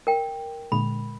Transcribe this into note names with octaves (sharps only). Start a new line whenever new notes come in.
A#4 G5
A#2 D3 G#3 B5